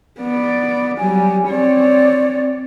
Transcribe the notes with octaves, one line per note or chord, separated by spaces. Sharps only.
B3 D5
F#3 G3 G#5
C4 C#5 D5